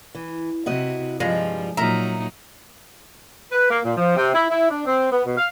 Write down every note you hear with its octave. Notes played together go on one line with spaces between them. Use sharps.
E3
C3 E4 F#4 D#5
G2 F3 G3 G#3 F4
A#2 F#3 D#4 A#4 E5 A#5
B4
A#3
A#2
F3
C3
E4
E4
D4
C4
B3
B2
F5